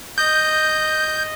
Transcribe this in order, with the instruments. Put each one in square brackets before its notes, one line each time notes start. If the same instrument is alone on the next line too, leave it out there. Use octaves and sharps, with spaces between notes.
[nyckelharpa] D#5 [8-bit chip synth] G6